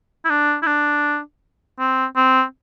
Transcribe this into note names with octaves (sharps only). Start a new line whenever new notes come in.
E4
D4
E4
D4
C4
C4